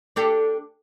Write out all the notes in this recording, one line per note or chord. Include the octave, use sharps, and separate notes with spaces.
D4 G4 A4